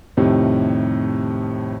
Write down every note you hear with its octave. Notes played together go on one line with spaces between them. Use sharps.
F2 A2 C3 D#3 G3